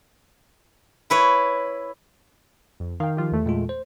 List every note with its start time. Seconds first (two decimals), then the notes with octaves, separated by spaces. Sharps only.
1.10 E4 B4 C#5
2.80 F2
3.00 D#3 F5 G5
3.17 F3 F4 G4
3.32 E2 A3
3.46 A#2 G#3 F4
3.69 C5